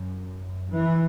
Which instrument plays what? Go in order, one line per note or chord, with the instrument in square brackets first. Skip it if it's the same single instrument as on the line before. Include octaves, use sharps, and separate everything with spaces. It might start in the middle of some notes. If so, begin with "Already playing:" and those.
Already playing: [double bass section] F#2
E3